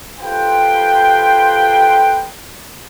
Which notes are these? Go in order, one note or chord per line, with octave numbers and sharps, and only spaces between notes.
F4 G4 A4 B4 C5 G5